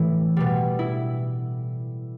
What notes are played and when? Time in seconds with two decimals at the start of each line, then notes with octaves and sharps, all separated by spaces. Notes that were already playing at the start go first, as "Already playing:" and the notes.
Already playing: A2 E3 G3 E4
0.37 B2 G3
0.79 E4